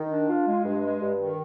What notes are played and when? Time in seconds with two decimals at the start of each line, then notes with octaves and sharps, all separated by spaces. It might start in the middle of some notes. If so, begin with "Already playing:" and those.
Already playing: D#3
0.11 D4
0.28 F4
0.46 G#3
0.64 G2
0.82 G#3
1.00 G2
1.18 D#3